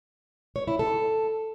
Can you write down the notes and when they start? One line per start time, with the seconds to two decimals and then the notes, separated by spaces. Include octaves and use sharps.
0.56 C#5
0.68 E4
0.79 A4